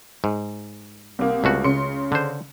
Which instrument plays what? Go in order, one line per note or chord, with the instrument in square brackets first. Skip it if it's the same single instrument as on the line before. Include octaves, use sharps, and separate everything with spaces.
[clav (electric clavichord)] G#2
[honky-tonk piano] C2 A#3
[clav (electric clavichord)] C#2 A3 F#4
[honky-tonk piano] C#3 C6 C#7
[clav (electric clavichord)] D3 C5